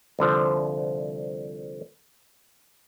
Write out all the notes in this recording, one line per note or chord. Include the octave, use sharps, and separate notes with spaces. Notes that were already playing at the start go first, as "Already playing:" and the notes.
C2 D3 F3 C5